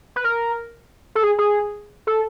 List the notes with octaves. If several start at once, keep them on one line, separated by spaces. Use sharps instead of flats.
B4
A#4
A4
G#4
G#4
A4